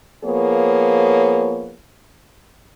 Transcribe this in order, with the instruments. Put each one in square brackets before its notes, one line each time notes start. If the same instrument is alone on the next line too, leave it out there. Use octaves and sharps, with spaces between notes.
[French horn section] F3 A#3 B3 G#4 C#5